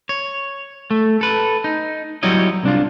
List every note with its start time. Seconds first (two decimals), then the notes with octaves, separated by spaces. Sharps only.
0.09 C#5
0.91 A3
1.21 A4 B4
1.64 D#4
2.23 F#3 G3 E4 C#5 D#5
2.63 C2 D4 F4